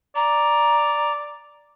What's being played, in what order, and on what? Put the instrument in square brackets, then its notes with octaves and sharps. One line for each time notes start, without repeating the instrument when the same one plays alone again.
[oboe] D5 [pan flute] A#5